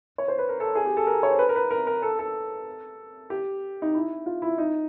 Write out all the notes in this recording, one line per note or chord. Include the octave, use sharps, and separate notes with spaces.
C#5
C5
B4
A#4
A4
G#4
G4
A4
A#4
C#5
C5
B4
A#4
B4
A#4
A#4
A4
A4
G4
D#4
E4
F4
E4
D#4